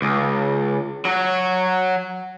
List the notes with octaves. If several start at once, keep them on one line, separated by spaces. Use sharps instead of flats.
C#2
F#3 F#4